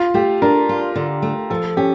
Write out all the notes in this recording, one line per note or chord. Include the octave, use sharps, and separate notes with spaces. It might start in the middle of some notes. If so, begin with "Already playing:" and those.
Already playing: F4
A3 G4
D4 A#4
F4
D3
A3
F3 A4
C#4 G4